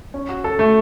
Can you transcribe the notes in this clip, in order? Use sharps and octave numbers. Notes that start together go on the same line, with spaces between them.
C#4
F#4
A4
A3